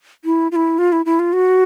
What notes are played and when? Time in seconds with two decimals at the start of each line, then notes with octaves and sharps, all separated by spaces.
0.25 E4
0.52 F4
0.56 E4
0.78 F4
0.92 E4
1.06 E4
1.19 F4
1.33 F#4